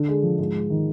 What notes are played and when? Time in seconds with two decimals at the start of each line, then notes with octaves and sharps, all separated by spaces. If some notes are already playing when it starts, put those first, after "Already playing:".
Already playing: D3
0.08 G#3
0.23 F3
0.38 G#2
0.55 G#3
0.70 D#3